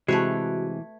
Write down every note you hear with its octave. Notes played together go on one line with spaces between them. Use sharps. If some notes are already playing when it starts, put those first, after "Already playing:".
C3 E3 G#3 A3 F#4 B4 C#5 F#6